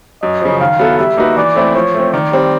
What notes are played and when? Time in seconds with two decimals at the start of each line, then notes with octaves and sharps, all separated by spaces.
0.22 F#2 D#5
0.42 C#3 F3
0.60 D#3 F5
0.79 F#3 B3 E4 A4
0.98 G3 E5
1.17 A#3 D#4 F#4 B4
1.37 E3 D5
1.55 A3 C4 E4
1.75 F3 C#5
1.94 A3 C4
2.13 D#3 D5
2.32 G3 C4